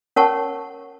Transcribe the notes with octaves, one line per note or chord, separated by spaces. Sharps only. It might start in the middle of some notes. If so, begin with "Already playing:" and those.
C#4 A#4 C#5 F#5 A5 C#6